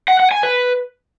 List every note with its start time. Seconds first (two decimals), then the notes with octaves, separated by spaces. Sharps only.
0.08 F#5
0.20 F#5
0.31 G#5
0.43 B4